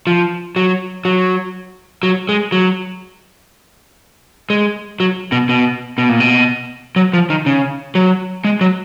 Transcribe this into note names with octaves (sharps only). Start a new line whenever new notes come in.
F3
F#3
F#3
F#3
G#3
F#3
G#3
F#3
B2
B2
B2
A#2
B2
F#3
F3
D#3
C#3
F#3
G#3
F#3